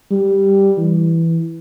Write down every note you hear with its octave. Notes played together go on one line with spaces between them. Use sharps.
G3
E3